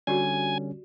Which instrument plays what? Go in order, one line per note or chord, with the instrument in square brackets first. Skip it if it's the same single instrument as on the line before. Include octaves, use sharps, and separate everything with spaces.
[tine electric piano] D3 G3 C#4 [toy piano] F#4 G4 D5 [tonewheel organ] G#5